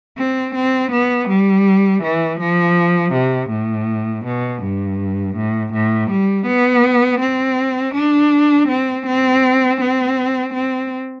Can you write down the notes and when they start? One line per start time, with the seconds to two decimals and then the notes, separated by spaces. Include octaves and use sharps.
0.19 C4
0.55 C4
0.92 B3
1.29 G3
2.03 E3
2.40 F3
3.14 C3
3.51 A2
4.26 B2
4.63 G2
5.37 A2
5.74 A2
6.11 G3
6.48 B3
7.21 C4
7.96 D4
8.69 C4
9.07 C4
9.81 C4
10.54 C4